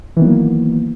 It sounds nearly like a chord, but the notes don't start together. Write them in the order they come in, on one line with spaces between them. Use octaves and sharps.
E3 D#3 B3 F#3 A#3